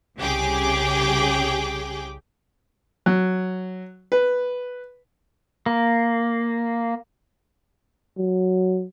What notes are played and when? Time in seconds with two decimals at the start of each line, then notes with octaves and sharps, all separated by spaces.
0.18 C2 C#3 G4 G#4 G5 D6
3.06 F#3
4.12 B4
5.66 A#3
8.17 F#3